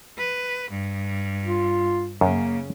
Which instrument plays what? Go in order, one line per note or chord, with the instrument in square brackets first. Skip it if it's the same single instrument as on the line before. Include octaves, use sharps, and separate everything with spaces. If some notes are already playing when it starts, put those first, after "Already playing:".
[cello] B4
G2
[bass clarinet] F4
[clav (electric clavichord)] F#2 [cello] C#3 [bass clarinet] A#3